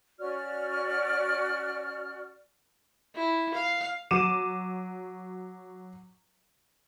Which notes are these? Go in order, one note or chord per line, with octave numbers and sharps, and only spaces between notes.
C#4 F#4 D5 F6
E4
F5
F#3 D6 D#7 E7